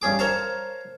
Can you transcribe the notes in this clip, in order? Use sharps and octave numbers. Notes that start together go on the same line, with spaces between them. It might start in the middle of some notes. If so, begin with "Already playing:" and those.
G2 C#4 G#4 D6
A#4 C5 C#5 F5 A5